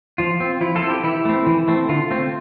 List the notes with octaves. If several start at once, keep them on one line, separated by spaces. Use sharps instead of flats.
F3 F4
C4
F3 E4
F4 A4
C4
E4 G4
E3 E4
A3 C4
E3
A3 C4
D3 F4
A3 C4